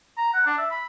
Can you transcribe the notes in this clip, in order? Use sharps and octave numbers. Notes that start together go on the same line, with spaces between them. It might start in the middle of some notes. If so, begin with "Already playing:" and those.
A#5
F#5
D4
E5
B5